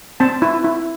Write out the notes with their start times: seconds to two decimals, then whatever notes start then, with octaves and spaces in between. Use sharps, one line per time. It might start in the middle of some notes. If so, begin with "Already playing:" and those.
0.20 C4 A5
0.42 E4
0.64 E4